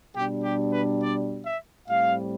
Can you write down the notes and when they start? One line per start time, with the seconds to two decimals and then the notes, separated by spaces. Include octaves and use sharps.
0.15 B2 G3 D4 G4
0.43 G4
0.73 B4
1.01 D5
1.44 E5
1.88 A2 G3 C4 F5